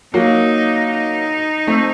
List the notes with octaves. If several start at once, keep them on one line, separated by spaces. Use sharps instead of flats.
F#3 A#3 D#4
D#4
A3 C4